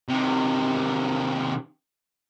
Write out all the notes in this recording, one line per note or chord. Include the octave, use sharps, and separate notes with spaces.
C3 D#3